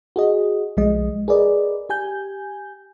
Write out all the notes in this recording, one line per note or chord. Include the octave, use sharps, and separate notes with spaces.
F#4 G#4 D#5
B1 F3 G#3 D#5
G#4 A#4 B4 D5 D#5
G4 G#5 G6